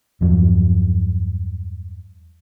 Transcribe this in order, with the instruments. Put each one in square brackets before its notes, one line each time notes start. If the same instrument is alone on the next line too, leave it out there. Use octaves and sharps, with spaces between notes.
[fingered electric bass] E2 G2 F3 F#3